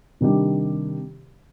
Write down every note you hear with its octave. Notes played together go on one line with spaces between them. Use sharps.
C3 D#3 G3 D4 G4